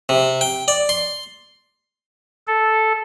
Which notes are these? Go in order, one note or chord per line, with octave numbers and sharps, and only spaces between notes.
C3
G5
D5
C6
A4